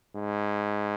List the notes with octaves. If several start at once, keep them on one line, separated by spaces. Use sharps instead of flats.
G#2